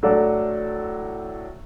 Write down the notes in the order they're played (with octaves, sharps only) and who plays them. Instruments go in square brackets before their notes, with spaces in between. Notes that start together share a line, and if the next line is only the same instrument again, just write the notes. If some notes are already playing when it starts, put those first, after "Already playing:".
[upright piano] A2 F#3 D4 A4 D5